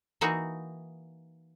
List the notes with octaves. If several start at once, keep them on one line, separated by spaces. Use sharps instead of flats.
E3 A#3 D#4 F#4